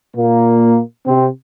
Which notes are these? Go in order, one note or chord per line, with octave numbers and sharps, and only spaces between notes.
A#2 A#3
C3 C4